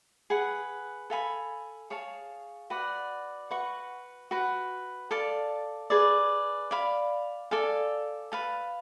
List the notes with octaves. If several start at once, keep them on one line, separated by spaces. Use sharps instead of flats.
G#4 B4 F#5
A4 F5 G#5 B5
G#4 C#5 F5 A5
F#4 B4 D5 F#5
F#4 B4 F#5 C#6
F#4 B4 F#5
A4 D5 F5 A5
G#4 B4 D5
D5 F5 B5
A4 D5 F5 G#5
B4 F5 A5